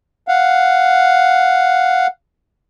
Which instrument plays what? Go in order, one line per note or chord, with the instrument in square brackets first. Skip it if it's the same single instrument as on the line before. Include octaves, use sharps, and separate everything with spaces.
[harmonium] F5 F#5